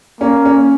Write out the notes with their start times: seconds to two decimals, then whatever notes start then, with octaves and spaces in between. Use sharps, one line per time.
0.21 A#3 C#4
0.45 C#4